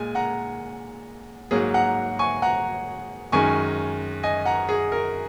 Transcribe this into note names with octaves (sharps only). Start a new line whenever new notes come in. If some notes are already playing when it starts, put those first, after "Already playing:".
Already playing: A#2 G#3 G#5
F#5 A#5
G#2 F#3 A#3 G#4
F#5 A#5
G#5 C#6
F#5 A#5
F#2 D#3 G#3 G#5 C#6
D#5 G#5
F#5 A#5
G#4
A#4